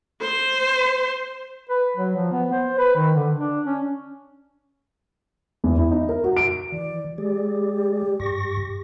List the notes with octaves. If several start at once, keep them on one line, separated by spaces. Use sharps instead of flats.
C5
B4
F#3
F3
B3
C5
B4
D#3
D3
D4
C#4
E2
E4
D#4
A#4
F#4
D7
E3 D5
G#3 G4 G#4 D5
G2 C#6 A#6